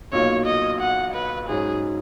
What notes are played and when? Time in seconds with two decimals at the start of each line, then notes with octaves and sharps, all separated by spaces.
0.13 B1 A#2 F#3 A#3 C#5
0.46 D#5
0.80 F#5
1.14 B4
1.48 G#2 F#3 C#4 G#4